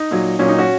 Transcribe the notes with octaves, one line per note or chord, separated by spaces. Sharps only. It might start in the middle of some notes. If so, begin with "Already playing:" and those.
Already playing: D#4
A#2 F#3
A#2 F#3 C#4
D#4
C#4 F#4